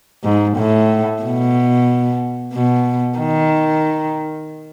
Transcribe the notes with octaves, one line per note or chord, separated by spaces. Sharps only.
G#2
A2
B2
B2
D#3